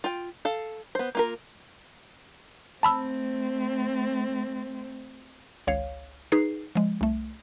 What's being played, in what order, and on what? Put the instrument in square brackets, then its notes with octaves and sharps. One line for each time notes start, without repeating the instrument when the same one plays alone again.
[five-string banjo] F4 G5
A4 F5
B3 C5
A#3 F4 A#4
[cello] A3 C4 [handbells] A5 B5 E6
[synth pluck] G#1 C#2 C#5 F5
D#4 G#4 B4 C7
F3 G#3
C2 A3